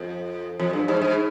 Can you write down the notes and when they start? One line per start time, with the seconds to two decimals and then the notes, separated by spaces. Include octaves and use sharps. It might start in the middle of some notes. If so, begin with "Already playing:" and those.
Already playing: F2
0.60 F2
0.73 G2
0.88 G#2
1.02 G#2